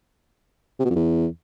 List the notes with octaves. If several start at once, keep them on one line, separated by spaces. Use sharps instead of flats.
C3
B2
F2
E2